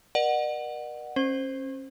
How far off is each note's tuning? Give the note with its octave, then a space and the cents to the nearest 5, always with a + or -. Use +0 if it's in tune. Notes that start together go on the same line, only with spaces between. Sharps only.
A#4 +40 D5 +45 F#5 +0
C#4 -35 C5 +0